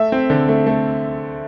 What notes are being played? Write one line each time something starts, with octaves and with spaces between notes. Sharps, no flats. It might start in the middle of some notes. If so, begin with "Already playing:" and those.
Already playing: A3 E5
C4
D3
A3
A3